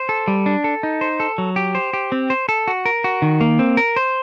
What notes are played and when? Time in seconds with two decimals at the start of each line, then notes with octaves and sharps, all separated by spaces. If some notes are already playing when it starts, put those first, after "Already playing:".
Already playing: C5
0.09 A4
0.28 G3
0.46 D4
0.64 A4
0.83 D#4
1.01 C5
1.20 A4
1.38 F#3
1.56 G4
1.75 C5
1.93 G4
2.12 C4
2.30 C5
2.49 A4
2.68 F#4
2.86 A#4
3.04 F#4
3.22 D#3
3.41 A#3
3.59 C4
3.77 A#4
3.96 C5